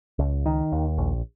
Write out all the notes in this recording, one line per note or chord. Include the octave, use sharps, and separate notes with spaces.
C#2
D#3
D#2
A#1